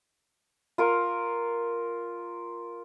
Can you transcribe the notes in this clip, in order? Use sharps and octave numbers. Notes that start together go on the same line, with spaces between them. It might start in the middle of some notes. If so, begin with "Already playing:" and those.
F4 A#4 F5